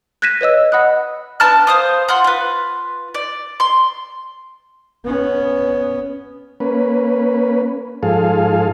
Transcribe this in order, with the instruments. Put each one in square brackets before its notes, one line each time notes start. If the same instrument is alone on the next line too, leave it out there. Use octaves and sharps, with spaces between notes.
[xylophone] F#6 G#6 A#6 B6 D#7 E7
B4 C#5 D#5 E6
D#5 F#5 B5 D#6 F#6
[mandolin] B3 D4 A5 F6
C5 F5 D#6
F4 F#5 C6
F4 B4
D5
C6
[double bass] B3 C#4
[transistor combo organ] A#3 C#4 B4
G#2 F3 G#4 A4 F5